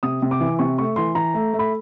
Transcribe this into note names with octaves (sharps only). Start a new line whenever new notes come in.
C3 D#6
C3
D6
E3
C3 C#6
A3 C#6
E3 C6
E3 A#5
A3
A3
B5